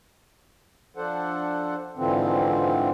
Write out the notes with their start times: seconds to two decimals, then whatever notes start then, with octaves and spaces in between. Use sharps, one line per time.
0.97 F3 D4 A4 C5 F#5
1.97 G#2 D3 E3 F3 C4